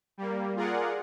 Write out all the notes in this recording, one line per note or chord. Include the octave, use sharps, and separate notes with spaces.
G3 A#3
F4 G#4 A#4 D5 F#5